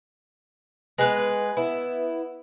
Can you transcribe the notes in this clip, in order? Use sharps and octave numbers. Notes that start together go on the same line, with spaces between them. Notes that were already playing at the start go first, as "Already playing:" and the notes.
G#3 B3 B4
B3 E4